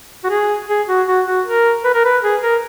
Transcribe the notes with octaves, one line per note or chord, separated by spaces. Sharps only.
F#4
G#4
G#4
F#4
F#4
F#4
A#4
B4
A#4
B4
G#4
A#4